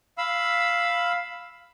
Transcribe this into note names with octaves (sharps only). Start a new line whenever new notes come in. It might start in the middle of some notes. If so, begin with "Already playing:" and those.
F5 B5 E6